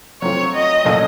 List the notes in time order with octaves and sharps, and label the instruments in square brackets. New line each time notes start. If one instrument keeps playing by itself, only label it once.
[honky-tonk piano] F#3 A3 C4 F4 [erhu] C#5
[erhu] D#5
[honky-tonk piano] A#2 F#3 A3 C#4 A4